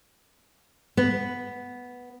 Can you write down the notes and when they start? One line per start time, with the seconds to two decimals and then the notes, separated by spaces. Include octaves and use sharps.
0.97 B3